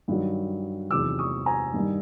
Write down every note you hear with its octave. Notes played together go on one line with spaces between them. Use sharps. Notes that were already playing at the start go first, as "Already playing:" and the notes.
G2 D#3 F#3
E2 C3 D#3 F#3 D6 E6
C#6 D#6
G#5 A#5
G2 D#3 G3